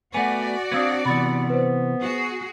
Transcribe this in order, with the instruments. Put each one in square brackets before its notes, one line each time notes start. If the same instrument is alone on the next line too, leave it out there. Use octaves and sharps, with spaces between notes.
[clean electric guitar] A3 B3 [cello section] F#4 D5 [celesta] F#5 G#5
[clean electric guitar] B3 C4 D4 [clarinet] F5 [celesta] D#6 E6 G#6
[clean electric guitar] C3 E3 [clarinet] B3 [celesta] B5 A6 C#7
[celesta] B4 C5
[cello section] F#4 G#4